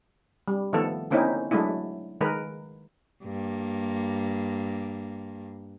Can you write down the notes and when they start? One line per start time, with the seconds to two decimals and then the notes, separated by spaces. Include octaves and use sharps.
0.48 G3
0.73 D#3 F3 A3 B3 A4
1.11 D3 A#3 C4 C#4 D#4 E4
1.51 F#3 G#3 A3 D4 E4
2.21 D#3 G#3 A#4 B4
3.24 G2 A#3